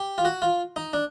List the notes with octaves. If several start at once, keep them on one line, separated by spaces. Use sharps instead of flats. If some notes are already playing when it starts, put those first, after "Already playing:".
Already playing: G4
F4
F#4
F4
D#4
D4